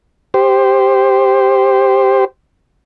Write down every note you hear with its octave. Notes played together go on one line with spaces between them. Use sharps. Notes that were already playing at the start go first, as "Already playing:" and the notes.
G4 C5